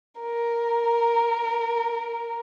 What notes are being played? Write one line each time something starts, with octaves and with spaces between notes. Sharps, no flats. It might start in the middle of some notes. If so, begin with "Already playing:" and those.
A#4